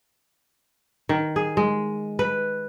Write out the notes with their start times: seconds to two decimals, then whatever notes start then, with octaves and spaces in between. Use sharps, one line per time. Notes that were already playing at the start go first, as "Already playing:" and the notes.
1.09 D#3
1.36 G#4
1.57 G#3
2.19 B4